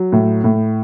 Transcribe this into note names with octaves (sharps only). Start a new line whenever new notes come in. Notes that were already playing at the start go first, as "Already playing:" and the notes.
Already playing: F#3
A2
A2